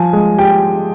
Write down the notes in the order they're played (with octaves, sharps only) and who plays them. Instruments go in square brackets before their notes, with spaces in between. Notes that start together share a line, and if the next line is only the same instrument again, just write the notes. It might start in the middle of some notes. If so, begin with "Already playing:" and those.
Already playing: [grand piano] F3 [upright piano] G#5
[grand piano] G#3
[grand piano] G4 [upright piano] G5